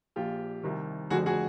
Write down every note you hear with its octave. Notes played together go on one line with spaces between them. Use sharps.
A#1 A#2 F3 F4 G4
C2 C3 D#3
F1 F2 D3 F3 F#4 G#4
F#4 G#4